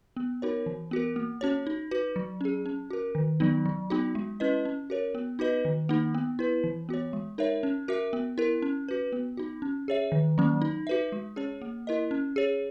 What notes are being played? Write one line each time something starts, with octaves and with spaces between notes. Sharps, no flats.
B3
D#4 F#4 A#4 C#5
E3
B3 F#4 A#4
A#3
C#4 F#4 C#5
D#4
F#4 B4
F#3
C#4 G#4
C#4
F#4 A#4
D#3
F#3 B3 D#4
F#3
B3 D#4 F#4
G#3
C#4 E4 B4 D#5
C#4
F#4 A#4 C#5
B3
D#4 F#4 B4 D#5
D#3
A#3 D#4
B3
E4 B4
E3
B3 F#4 C#5
G#3
D#4 A#4 C#5 E5
C#4
F#4 A#4 E5
B3
E4 A#4
C#4
F#4 B4
B3
D#4 F#4
C#4
G#4 C#5 E5
D#3
F#3 A#3 C#4
D#4
F#4 B4 E5
G#3
C#4 G#4 C#5
A#3
E4 A#4 D#5
C#4
G#4 C#5